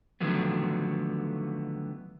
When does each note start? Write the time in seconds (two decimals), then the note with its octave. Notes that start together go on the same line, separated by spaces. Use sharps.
0.21 D3 D#3 F3 F#3 A3 B3